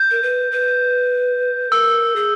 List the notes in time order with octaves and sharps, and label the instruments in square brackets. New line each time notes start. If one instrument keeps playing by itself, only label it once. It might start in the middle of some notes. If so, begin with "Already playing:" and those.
Already playing: [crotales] G6
[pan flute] A#4
B4
B4
[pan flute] A#4 [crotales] E6
[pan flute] G#4